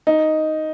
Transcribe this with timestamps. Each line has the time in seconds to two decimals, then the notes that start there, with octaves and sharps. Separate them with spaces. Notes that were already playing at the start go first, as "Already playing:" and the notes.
0.07 D#4